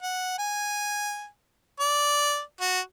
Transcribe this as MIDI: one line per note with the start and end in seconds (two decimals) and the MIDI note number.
0.03 0.35 78
0.39 1.26 80
1.80 2.40 74
2.60 2.80 66